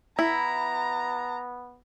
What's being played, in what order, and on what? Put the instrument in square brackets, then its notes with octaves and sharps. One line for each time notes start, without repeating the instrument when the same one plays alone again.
[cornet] B3 [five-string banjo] E4 [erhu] A#5